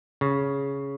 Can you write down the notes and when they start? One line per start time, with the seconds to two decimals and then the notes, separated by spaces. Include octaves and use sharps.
0.21 C#3